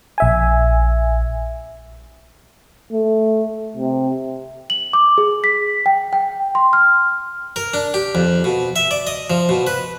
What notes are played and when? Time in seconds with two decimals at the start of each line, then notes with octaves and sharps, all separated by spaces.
0.18 A#1 E5 G#5
2.92 A3
3.77 C3
4.70 F#7
4.93 D6
5.18 G#4
5.44 B6
5.86 G5
6.13 G5
6.55 C6
6.73 F6
7.56 A#4
7.74 D4
7.94 G4
8.15 F2
8.44 B2
8.76 E5
8.91 D5
9.07 D#5
9.30 F3
9.49 B2
9.67 B4